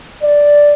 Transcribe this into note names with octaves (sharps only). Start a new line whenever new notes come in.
D5